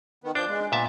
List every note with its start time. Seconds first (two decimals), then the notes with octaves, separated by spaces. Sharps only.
0.24 D#3 B3
0.35 F3 D4 G6
0.49 G#3
0.72 A#2 B3 E5 A5